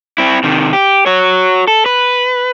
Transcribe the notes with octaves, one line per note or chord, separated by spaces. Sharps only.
C4 E4
C3 D#3
G4
F#4 C#5
A4
B4